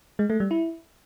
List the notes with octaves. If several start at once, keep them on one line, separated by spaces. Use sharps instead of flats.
G#3
A3
G3
E4